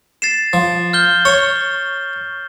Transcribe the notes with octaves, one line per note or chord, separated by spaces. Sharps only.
A6 C7 E7
F3
F6 G6 G7
C#5 C#6